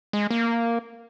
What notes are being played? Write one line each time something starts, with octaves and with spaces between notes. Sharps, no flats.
G#3
A#3